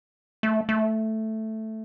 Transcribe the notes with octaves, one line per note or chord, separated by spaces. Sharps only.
A3
A3